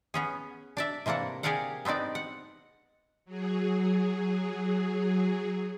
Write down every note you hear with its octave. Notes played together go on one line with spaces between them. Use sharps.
B3 C#4 G#4
D4 D5 E5
C3 E3 A#3 D4 F#5
G4 G#4 A#4 D5 F5 F#5
B3 C4 D4 D#4 D5
F#5
F#3 G#4